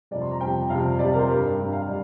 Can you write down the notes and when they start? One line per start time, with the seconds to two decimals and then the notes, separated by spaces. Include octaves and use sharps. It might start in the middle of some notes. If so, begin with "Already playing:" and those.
0.11 F2 C3 G3 D5
0.22 C6
0.31 A#5
0.41 F2 C3 G3 G5
0.70 F2 C3 G3 F5
0.99 F2 C3 G3 D5
1.14 A#4
1.19 C5
1.28 G2 G3 A#4
1.58 G2 G3
1.72 F5
1.87 G3 D5